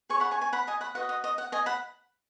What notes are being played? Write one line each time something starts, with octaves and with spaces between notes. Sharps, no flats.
G#4 C#5 G#5 C#6
F#5 B5
G#5 C#6
G#5 C#6
F#5 B5
D#5 G#5
F#5 B5
F#4 B4 D#5 F#5
D#5
D#5
F#5
D#5 G#5
F#5 B5